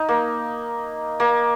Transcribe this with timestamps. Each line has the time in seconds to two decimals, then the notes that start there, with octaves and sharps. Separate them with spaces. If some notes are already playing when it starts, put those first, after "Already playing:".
Already playing: D#4
0.09 A#3
1.20 A#3